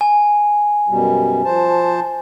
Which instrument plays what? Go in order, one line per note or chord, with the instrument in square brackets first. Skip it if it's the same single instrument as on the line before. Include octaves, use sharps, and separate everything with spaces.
[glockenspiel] G#5
[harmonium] F#2 B2 G3
F3 C5 A5